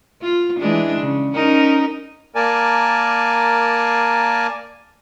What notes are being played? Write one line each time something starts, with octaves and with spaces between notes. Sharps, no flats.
F4
E3 G#3 D4
C#3
C#4 D#4 A#4
A#3 A#4 D5 G#5 A5